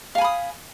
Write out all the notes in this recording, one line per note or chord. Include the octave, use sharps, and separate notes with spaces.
F5 G#5 B5 D#6